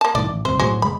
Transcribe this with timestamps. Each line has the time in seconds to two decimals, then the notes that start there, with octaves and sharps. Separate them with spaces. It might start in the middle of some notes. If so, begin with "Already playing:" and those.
0.01 A#3 A5
0.15 C2 A2 D#3 D5
0.30 A1
0.45 G1 C#2 C3 C5
0.59 B1 A2 F#3 F#4 G#4 C5
0.82 F#1 G#3 B5